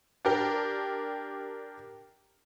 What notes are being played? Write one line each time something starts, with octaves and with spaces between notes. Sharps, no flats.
D4 G4 A#4 G5